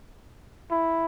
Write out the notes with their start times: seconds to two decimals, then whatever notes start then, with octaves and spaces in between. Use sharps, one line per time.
0.71 E4